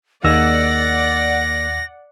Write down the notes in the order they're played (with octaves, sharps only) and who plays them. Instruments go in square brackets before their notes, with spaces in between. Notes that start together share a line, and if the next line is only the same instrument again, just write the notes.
[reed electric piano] D#2 E6 [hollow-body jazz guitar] A#3 D#4 G#4 [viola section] D5 F#5 [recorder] A#6